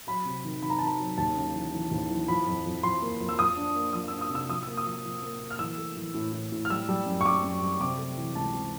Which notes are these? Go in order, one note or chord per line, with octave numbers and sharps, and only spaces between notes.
F#3 B5
C3
D#3
D#3 B5
A#5
A5
D#3 A#5
F#3
D#2 A5
C#3
E3
E3
D#2
E3
F3 B5
F2
F2
F3 C6
A#3
F2
E6
F3 D#6
D4
A#3
F3 D#6
D4 E6
D#6
C3
E6
F3 D#6
A#3 E6
D#6
F3
F3
A#3
A#3
F6
E3 E6
A3
E3
A2
A2
A2
F6
G3 E6
G3
F#2
C#6
F#2 D6
F#2
G3
C3 D6
A3
E3
C#2 A5
C3